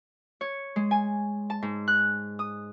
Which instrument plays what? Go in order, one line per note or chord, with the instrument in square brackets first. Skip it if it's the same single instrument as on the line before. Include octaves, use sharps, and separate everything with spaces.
[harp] C#5
G#3
G#5
A5
G#2
F#6
D#6